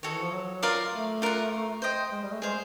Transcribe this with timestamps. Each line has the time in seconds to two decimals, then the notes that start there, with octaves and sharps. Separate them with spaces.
0.03 D#3 F#4 A4 C#5
0.13 E3
0.22 F3
0.32 F#3
0.63 F4 A#4 D5 F5
0.93 A3
1.22 F4 A#4 D5 F#5
1.82 C5 D#5 G5
2.12 G#3
2.23 G3
2.31 A3
2.42 G#3 G#4 C5 F5